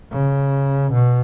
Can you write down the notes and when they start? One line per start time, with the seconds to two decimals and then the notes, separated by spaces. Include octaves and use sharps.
0.12 C#3
0.93 B2